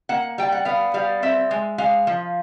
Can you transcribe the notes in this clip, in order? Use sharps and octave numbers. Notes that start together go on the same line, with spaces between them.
A#3 F#5
G3 G5
F#5
B3 F5
G3 F5
C4 E5
G#3
G#3 F5
F3